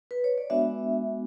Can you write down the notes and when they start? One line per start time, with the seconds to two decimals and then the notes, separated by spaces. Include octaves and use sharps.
0.11 B4
0.24 C#5
0.38 D5
0.50 G#3 B3 D4 F#4 E5